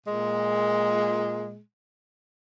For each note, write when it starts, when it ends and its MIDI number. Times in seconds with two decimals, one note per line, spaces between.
0.05 1.59 46
0.05 1.59 56